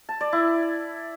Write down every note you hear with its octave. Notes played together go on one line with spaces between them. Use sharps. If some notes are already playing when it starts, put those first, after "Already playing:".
A5
D5
E4